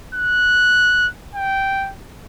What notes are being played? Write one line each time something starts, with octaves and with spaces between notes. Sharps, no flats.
F#6
G5